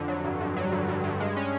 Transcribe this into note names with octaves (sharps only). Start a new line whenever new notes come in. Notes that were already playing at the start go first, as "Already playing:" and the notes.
Already playing: F2 D3
F#3
G2
G2
F#3
G2
G2
G2
G#3
C#4